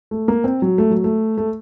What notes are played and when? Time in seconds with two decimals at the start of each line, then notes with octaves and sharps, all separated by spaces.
0.11 A3
0.28 A#3
0.44 C4
0.62 F#3
0.78 A3
0.91 F#3
1.04 A3
1.38 A3